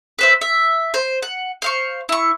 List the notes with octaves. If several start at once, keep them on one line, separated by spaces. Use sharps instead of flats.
B4 C5 E5
E5
C5
F#5
C5 F5 C#6
E4 C#6